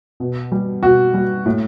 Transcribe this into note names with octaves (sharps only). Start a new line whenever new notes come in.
B2
G3
B2 F#4
G3
A2